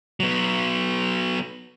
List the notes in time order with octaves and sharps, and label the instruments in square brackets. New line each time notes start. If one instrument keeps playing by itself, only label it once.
[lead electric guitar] F#3 B3